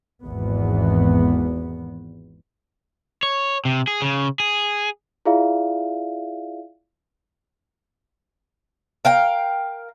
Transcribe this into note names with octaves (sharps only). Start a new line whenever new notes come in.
G#1 E2 B3
C#5
C3
G#4
C#3
G#4
E4 F4 G#4 D5 E5 F5
A#4 F5 G5